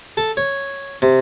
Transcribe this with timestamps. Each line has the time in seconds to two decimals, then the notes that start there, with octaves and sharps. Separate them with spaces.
0.17 A4
0.37 C#5
1.02 C3